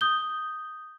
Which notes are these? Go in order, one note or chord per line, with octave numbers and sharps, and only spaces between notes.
D#6 G6 G7